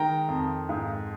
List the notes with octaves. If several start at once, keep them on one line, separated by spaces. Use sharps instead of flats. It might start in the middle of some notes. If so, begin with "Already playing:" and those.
Already playing: D#3 G#3 G5 A#5
F2
G#2